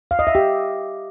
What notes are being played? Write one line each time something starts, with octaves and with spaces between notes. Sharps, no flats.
F5
D#5
E5
G4